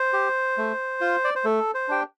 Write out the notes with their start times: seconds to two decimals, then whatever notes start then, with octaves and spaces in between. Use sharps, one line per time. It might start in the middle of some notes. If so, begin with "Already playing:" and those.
Already playing: C5
0.13 G4
0.57 A3
1.01 F4
1.24 D5
1.35 C5
1.44 A3 A4
1.74 C5
1.88 D4 G4 G5